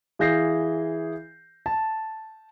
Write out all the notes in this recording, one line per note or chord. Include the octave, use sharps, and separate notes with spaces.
E3 G#4 F5 G6 A#6 C7
A5